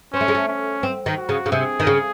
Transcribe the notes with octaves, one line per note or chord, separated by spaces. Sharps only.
C4 C#4
A3
G#3
A3
C#4
C4
D#3
F#4
C#3
C#3
C3 G#4
D#3
C#3